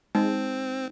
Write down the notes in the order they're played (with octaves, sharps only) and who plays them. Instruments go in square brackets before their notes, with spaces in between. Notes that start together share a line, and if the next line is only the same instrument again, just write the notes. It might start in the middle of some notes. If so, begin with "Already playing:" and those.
[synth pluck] G#3 [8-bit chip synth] C4 [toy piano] D#4